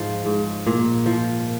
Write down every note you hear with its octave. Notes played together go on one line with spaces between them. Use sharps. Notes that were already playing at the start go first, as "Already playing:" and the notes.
Already playing: G#2 F3
G#2
A#2
F3